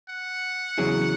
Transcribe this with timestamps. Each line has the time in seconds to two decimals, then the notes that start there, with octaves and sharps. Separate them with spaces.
0.09 F#5
0.78 E2 C#3 F#3 E4 G#4